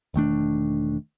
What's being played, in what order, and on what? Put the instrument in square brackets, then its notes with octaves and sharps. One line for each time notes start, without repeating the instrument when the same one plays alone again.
[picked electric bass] E1 D#3 A3 D4